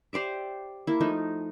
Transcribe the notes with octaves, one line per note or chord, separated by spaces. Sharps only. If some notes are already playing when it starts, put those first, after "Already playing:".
G4 C5 D5 E5
A#3 E4
F3 A3 D#4